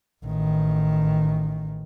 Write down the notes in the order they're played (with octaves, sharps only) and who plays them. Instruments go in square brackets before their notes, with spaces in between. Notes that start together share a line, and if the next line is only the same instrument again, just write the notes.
[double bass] A1 D#3